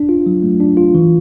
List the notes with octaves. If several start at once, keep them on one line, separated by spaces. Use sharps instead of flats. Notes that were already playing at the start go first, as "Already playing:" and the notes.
Already playing: D4
F4
F#3
A3
D4
F4
E3